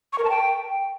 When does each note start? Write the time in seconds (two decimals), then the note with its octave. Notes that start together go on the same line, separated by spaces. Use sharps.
0.13 C#6
0.18 A#4
0.24 A5
0.30 G5